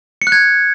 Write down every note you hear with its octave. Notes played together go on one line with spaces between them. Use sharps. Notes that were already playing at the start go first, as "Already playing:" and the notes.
C#7
F#6
G#6